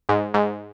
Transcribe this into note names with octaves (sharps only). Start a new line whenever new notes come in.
G#2
G#2